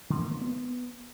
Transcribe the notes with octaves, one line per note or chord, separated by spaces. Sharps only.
D3
A#3
A#3
B3